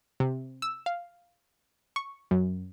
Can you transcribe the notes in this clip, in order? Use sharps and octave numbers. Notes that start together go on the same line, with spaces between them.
C3
E6
F5
C#6
F#2